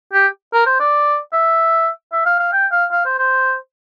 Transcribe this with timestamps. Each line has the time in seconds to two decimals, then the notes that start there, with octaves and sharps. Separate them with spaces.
0.13 G4
0.53 A#4
0.66 C5
0.80 D5
1.33 E5
2.12 E5
2.26 F5
2.39 F5
2.53 G5
2.72 F5
2.92 F5
3.05 C5
3.18 C5